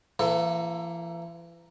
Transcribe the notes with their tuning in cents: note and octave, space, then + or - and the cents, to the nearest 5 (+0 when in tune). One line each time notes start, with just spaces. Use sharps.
E3 +40 A#3 +0 A4 +15